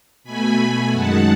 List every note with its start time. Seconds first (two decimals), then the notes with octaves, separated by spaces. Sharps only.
0.24 B2 A3 G#5 B5
0.92 F#2 D#3 G#3 F#5 A5